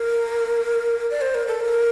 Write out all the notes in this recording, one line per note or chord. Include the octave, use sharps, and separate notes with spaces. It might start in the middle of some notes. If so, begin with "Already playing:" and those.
Already playing: A#4
D5
C5
A#4
A4
A#4